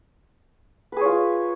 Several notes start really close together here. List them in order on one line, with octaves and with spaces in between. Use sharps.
B4 G#4 C#5 F4